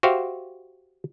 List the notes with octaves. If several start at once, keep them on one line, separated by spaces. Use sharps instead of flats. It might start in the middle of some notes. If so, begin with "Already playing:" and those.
F#4 G4 C5 E5 F5